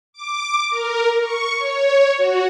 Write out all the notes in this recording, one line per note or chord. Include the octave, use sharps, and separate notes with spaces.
D6
A#4
C#6
C#5
F#4